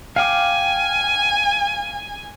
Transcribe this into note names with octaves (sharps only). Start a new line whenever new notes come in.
F5 G5 G#5 D6